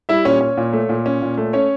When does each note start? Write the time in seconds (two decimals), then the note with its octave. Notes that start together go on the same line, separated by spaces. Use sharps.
0.09 G3 E4 E5
0.25 A#2 C#4 C#5
0.41 C#4
0.57 A#2
0.73 A3
0.89 A#2
1.06 C#4
1.22 A#2
1.37 A3
1.53 C#4 C#5